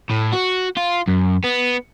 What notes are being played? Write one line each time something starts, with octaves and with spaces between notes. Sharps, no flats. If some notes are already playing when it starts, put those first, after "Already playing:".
A2
F#4
F4
F#2
B3